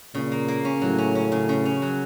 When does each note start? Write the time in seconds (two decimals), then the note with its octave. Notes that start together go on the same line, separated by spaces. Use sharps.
0.15 A#2 C#3
0.32 A#3
0.48 A#3
0.65 C#4
0.82 A2 F#3
0.98 C#4
1.15 C#4
1.32 C#3
1.49 C#3
1.65 C#4
1.82 F#3